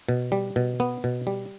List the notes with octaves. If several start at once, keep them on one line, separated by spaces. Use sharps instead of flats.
B2
G3
B2
B3
B2
G3